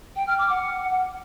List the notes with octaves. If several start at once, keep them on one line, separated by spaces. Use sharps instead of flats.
G5
F6
D6
F#5